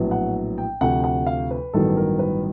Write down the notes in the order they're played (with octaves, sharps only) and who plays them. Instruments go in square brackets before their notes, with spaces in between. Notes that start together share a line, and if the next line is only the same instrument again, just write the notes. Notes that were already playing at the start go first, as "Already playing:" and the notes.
Already playing: [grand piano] A#1 A2 F#3 B3
F#5
G5
D2 C3 F3 F#5
F#5
F5
B4
A1 G2 D#3 F#3 B3 A4
A#4
B4